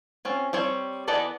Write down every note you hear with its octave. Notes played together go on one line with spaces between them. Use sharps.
C4 C#4 F4
G3 C4 C#5
E3 B3 A4 D5 D#5